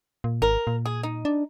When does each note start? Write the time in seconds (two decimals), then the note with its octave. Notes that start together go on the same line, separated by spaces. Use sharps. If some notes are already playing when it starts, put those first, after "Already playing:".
0.24 A#2
0.42 G#1 A#4
0.67 A#2
0.86 G#4
1.03 D#4
1.25 D4